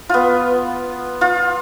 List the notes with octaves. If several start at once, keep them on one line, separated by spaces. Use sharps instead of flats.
B3 F4
F4